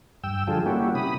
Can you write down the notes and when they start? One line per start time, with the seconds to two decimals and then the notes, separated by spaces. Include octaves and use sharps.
0.24 G2 G5 E6
0.47 D3 F3 G3 F4 G#4 A4
0.66 G3 A#3 C#4 E4 F#4 G4
0.95 C3 B5 D#6